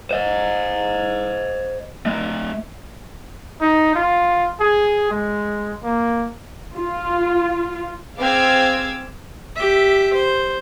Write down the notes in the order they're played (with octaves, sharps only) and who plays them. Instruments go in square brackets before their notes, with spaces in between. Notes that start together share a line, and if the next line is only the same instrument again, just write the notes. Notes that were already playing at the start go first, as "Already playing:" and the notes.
[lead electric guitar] C5 D#5
A3 D#5
[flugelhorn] D#4
F4
G#4
G#3
A#3
[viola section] F4
[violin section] C4 G#4 F5 D6 E6 G#6
[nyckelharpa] G4 E5
C5